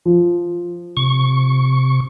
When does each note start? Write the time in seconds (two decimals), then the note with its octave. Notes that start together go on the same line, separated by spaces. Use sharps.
0.05 F3
0.97 C3 C#6